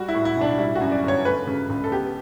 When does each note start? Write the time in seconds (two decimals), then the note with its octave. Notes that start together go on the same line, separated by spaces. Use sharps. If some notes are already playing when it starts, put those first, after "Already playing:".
Already playing: G3 F#4
0.08 E4
0.15 A2
0.25 E4
0.37 B1 D4
0.58 G3 E4
0.75 F#4
0.81 F#2
0.92 D5
1.03 G1
1.08 C#5
1.25 A3 B4
1.47 C#3
1.70 C#2
1.84 A4
1.92 B3 G4